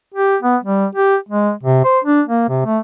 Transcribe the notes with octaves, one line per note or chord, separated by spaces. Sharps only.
G4
B3
G3
G4
G#3
C3
C5
D4
A#3
C3
A3